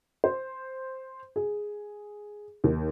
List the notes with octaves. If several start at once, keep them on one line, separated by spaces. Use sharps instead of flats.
C5
G#4
D#2